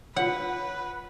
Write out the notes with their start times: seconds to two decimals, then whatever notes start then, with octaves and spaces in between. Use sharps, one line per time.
0.16 F4 B4 C#5 F#5